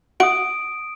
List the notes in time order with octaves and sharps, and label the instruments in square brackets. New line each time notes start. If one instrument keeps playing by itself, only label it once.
[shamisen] F#4 E5 F#5 [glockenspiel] D#6 D7